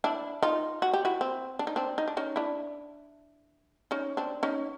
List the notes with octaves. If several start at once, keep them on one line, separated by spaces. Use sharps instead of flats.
D4 E4
D#4 F4
F#4
G4
E4 F#4
C4
D4
D#4
C4 D4
D#4
D4
C#4 D#4
D4 E4
C#4 D#4
C4 D4
C#4 D#4